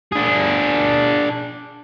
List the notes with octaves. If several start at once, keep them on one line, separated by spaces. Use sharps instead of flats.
D4 G#4